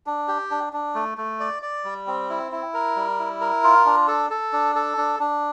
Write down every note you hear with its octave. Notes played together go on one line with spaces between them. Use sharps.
D4
G4
D4
D4
A3
A3
D5
D5
G3
C4
E4
E4
A#4
G3
E4
A#4
F4
D4
A4
A4
D4
A4
D4
D4